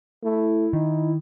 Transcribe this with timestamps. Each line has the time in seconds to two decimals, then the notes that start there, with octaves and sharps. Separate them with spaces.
0.24 A3 E4
0.73 D#3 D#4